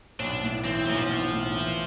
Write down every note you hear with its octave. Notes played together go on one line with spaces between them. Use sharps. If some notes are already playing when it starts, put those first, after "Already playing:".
B1 D4
A2
E3 C4
B1 F3
B1
A2
E3